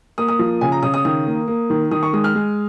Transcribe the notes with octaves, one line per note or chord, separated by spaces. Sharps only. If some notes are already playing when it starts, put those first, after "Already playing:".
A#3 D#6
D#6
F3
C#3 G#5
A#5
C#3 D#6
D#6
D#3 D#6
A#3
A#3
D#3
D#3 D#6
C#6
G#3 D#6
F6
G#3